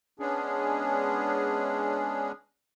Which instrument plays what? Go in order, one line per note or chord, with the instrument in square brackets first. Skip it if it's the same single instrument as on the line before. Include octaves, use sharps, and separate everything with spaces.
[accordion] G#3 B3 C#4 D4 G#4